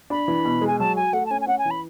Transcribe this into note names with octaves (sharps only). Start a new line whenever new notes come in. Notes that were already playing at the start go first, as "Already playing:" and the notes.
D4 B5
E3
B2
G#3
G#5
F#3 A5
F#4 G#5
A3 F#5
A5
C#4 G#5
G#5
C#4 F#5
G#5
E3
B5